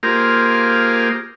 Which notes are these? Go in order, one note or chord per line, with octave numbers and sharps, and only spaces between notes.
A#3 F4 G4 G#4 A#4 C5